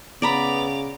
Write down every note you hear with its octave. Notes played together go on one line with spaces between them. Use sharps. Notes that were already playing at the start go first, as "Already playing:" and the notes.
C#3 B3 D5 A#5 B5 D6 F7